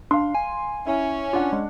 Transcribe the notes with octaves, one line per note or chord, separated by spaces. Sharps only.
D4 F5 C6
G#5
C#4 E4
D4 F4 F#5
G#3